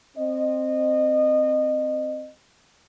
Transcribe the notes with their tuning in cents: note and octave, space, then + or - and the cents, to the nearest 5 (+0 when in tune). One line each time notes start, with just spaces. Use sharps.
C4 +0 D#5 -25